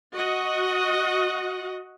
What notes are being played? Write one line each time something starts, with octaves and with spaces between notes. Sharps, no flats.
F#4 D#5 F#5